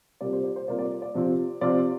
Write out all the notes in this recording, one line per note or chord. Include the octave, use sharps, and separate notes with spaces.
C3 G3 A#3 F4 D5
C5
D5
C5
C3 G3 A#3 F4 D5
D5
D5
C3 F3 C4 F4
C3 F3 C4 F4 D5